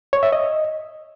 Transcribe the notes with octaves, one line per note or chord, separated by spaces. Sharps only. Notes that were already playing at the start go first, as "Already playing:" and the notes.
C#5
E5
D#5